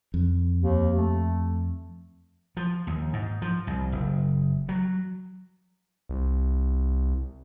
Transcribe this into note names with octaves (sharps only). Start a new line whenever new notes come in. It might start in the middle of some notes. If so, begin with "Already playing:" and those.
F2
D#2
A3
F3
D#2
G#2
F3
C2
F#1
F#3
C2